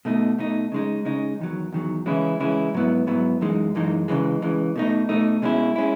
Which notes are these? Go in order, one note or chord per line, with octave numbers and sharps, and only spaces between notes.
B2 A3 D#4
B2 A3 D#4
C#3 G#3 D#4
C#3 G#3 D#4
E2 D#3 F#3
E2 D#3 F#3
C#3 E3 G#3 C#4 E4
C#3 E3 G#3 C#4 E4
G#2 F#3 B3 E4
G#2 F#3 B3 E4
F#2 E3 G#3 D#4
F#2 E3 G#3 D#4
C#2 C#3 E3 G#3
C#2 C#3 E3 G#3
B2 A3 D#4
B2 A3 D#4
B2 G#3 C#4 E4
G#3 C#4 E4